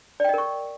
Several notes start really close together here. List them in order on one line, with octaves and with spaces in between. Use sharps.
D5 G5 D#5 A#4 C#6